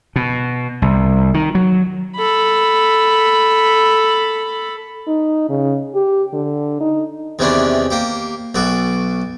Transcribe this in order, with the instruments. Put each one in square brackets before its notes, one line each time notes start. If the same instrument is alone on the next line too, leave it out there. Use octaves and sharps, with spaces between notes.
[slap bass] B2
C2
D#3
F#3
[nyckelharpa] A4 B5
[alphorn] D#4
C#3
G4
D3
D#4
[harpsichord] E2 C3 D#3 E3 C#4 D4
A#3 G4
B1 F#4 A4 D6